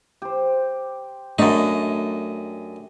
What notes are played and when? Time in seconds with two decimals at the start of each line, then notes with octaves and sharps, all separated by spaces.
0.22 G4 C5
1.39 F#2 A3 D4 D#4